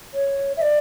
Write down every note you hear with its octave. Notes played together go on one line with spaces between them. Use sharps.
C#5
E5
D5